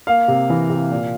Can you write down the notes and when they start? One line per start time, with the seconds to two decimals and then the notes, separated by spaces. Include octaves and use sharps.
0.07 A#3 F5
0.28 C3
0.50 E3
0.70 C3
0.91 A#2